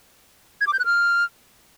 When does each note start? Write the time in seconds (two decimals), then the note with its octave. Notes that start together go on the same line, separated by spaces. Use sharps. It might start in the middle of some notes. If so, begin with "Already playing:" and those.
0.61 G#6
0.67 D6
0.73 G6
0.79 F#6
0.86 F6